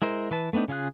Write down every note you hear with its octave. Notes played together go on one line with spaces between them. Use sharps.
G#3 E4 A#4 C5
E3 B4 A5
A3 B3 C4 D4 D#4
C#3 C#4 F4 G#4 F#6